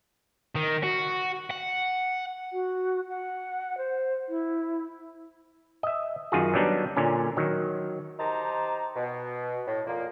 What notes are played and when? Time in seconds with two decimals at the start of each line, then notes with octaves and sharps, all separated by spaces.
0.55 D#3
0.83 F#4
1.50 F#5
2.53 F#4
3.09 F#5
3.78 C5
4.29 E4
5.83 D#5 E5
6.32 F#2 D#3 F4 F#4 G#4
6.54 F#3 G3 B3 D4 D#4
6.96 A#2 D3 C#4
7.37 D#3 F#3
8.19 D#4 G4 C5 A5 A#5
8.96 B2
9.67 A2
9.86 F2 A#2 F3 A#3